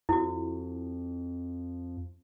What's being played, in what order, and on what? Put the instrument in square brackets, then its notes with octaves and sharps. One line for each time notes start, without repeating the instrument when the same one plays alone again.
[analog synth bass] F2 [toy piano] E4 F#4